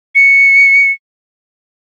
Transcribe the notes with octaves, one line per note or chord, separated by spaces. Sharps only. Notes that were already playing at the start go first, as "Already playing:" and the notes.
C#7